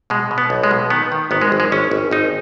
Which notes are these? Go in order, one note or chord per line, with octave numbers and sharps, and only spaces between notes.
B2 G#3
B2
B3
B1
G#3
B2
D#3 B3
D#3
G#1 B3
G#3
G#1
G#3
G#1 C#4
G#1
G#1 D#4